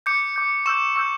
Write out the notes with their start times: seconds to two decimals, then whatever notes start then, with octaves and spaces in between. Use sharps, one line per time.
0.06 D6 G6 C#7
0.36 D6 G6
0.66 C#6 E6 G6 E7
0.96 C#6 E6 G6